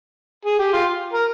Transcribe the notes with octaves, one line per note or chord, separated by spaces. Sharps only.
G#4
G4
F4
A#4